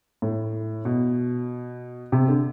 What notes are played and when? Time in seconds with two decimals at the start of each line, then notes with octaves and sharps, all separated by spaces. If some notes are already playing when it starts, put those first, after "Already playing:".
0.22 A2
0.85 B2
2.12 C3
2.28 D3